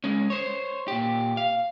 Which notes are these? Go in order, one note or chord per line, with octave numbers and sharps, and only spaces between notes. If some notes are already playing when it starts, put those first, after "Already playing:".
G#3 C#4
C5 C#5
A#2 G4
F5